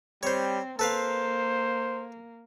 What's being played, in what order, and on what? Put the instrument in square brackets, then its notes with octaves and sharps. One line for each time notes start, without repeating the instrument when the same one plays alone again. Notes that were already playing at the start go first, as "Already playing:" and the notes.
[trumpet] G3 [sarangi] C4 [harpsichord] C5 C#5
[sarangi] A#3 [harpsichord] A4 B4 F5 [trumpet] C5